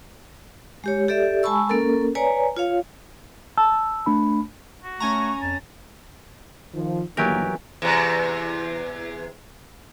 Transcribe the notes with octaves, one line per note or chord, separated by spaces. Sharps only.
G#3 G4 C#5
G4 A4 D5 E5
G#3 G#5 A5 B5 C#6 E6
A#3 C#4 A4 A#4
B4 C#5 D5 G#5 A#5
F4 C#5 F5
A5 E6
A3 D4 B5
F#4
A3 C#4 G#5 A#5 C#6
F2 A5
D#3 F3
G1 D#3 E3 F#3 A#3 G4 A#4
E2 C3